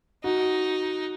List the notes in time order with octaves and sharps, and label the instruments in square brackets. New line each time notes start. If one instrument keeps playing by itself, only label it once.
[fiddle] D#4 [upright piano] F#4